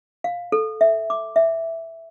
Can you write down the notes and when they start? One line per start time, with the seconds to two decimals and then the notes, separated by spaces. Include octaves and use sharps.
0.24 F5
0.52 A4
0.81 E5
1.10 D6
1.36 E5